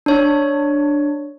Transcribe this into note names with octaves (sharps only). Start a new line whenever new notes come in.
D4 C#5